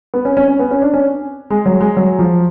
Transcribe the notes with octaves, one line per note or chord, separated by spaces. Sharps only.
B3
C#4
C#4
C#4
B3
C#4
D4
C#4
G#3
F#3
G#3
F#3
F3